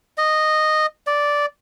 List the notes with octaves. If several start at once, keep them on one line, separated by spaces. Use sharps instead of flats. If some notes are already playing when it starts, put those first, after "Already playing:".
D#5
D5